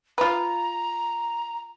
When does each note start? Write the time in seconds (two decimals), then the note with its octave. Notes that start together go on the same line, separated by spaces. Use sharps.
0.18 F4 B4 A#5